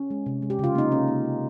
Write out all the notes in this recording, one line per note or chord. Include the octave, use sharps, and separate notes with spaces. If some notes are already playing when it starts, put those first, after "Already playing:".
Already playing: C#4
G#3
C3
G#3
G4
C#3 F4
A#3 D#4
C3 C#4
A#3
C3